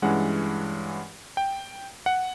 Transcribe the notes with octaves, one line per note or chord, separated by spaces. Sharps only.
G2 E3 G#3 C#4 F#5
G5
F#5